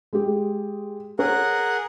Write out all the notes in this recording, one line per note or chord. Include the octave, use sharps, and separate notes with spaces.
G#3 G4
G#4 A#4 C#5 F#5